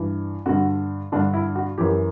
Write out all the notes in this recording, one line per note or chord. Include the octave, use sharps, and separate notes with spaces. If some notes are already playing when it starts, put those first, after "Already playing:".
Already playing: G2 E3
G2 D3 F#4
G2 D3 D4
E4
F#4
F#2 E3 G4